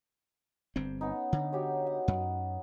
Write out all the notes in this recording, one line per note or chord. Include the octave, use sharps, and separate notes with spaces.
G1 G2 C4
B3 C#4 D#4
D3
F#4 G4 C#5
F#5
F#2